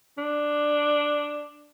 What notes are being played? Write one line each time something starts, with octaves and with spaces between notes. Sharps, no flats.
D4